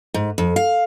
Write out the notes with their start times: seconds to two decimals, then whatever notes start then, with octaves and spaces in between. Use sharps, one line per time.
0.14 G#2
0.38 F2
0.56 F5